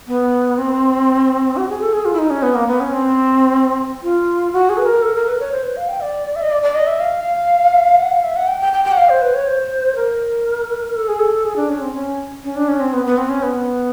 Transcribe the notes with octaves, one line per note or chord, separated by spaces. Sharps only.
B3
C4
F#4
G#4
A4
G#4
F4
E4
D#4
C#4
B3
A#3
B3
C#4
C4
F4
F#4
G#4
B4
A#4
A4
A#4
B4
C#5
C5
B4
F5
G5
D5
E5
D#5
D5
D5
D#5
E5
F5
F#5
F5
E5
F#5
G5
G5
G5
G5
F#5
F5
C5
B4
C#5
C5
A#4
A4
G#4
A4
G#4
D4
C#4
C4
C#4
C#4
D4
C#4
C4
B3
B3
C4
C#4
B3